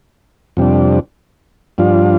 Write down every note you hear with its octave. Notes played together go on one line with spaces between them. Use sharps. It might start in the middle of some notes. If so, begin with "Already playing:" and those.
F2 C3 G3 D4
G2 F3 D4 F4